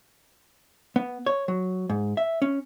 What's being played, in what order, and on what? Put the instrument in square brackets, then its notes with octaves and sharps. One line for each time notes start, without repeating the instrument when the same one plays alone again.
[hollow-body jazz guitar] B3
C#5
F#3
G#2
E5
C#4